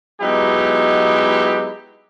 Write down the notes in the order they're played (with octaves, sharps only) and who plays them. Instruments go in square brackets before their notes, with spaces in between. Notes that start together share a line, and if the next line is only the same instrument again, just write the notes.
[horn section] F#3 G#3 B3 D#4 E4 G4